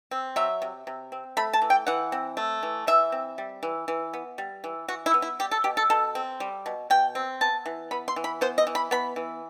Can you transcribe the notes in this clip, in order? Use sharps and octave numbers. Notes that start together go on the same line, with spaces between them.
C4
F#3 E5
C3
C3
C4
A3 B5
A5
E3
G5
E3 F#5
C4
A3
E3
E3 E5
C4
G3
E3
E3
B3
G3
E3
E3 F#4
E4
B3
E4
G3 G4
A4
B2 G4
A4
B2 A4
C4
G3
B2
B2 G5
C4
B3 A5
E3
B3 B5
C6
E3
B5
B3 C5
D#5
E3
B5
B3 B5
E3